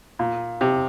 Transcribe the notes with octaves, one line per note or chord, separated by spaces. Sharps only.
A#2
C3